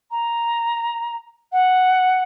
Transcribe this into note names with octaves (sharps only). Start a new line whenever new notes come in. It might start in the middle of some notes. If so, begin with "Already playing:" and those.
A#5
F#5